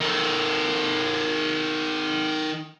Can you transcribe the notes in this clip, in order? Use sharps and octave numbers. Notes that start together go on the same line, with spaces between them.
D#3 A4